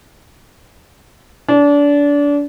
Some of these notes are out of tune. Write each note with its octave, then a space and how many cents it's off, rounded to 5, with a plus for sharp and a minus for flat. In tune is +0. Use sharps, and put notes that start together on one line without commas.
D4 -30